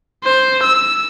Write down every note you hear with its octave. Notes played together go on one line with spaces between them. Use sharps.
C5
E6